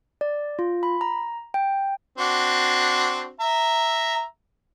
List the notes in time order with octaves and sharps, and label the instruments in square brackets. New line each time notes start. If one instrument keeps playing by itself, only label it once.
[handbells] D5
F4
B5
A#5
G5
[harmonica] C4 D4 F#4
E5 A#5